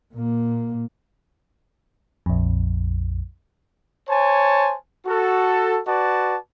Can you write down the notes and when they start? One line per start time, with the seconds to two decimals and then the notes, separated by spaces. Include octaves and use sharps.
0.14 A#2 A#3
2.26 A#1 F2
4.09 C5 C#5 G#5 A5
5.06 F#4 A4
5.87 F#4 B4 D5 A5